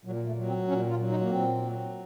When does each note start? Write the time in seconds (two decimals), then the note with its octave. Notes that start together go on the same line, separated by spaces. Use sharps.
0.05 A#2 F#3
0.26 A3
0.36 F#3
0.47 C4
0.67 A#2 C#4
0.89 F4
0.99 F#3
1.09 D#4
1.21 A#3
1.30 A#2 C4
1.62 F#3